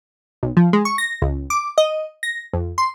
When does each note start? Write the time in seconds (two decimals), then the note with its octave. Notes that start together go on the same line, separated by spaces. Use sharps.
0.43 B1
0.57 F3
0.73 G#3
0.85 C#6
0.98 A#6
1.22 C#2
1.50 D6
1.78 D#5
2.23 A#6
2.53 F2
2.78 C6